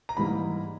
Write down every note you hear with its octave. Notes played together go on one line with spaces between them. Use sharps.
A#5
G#2 E3 G3 A#3 B5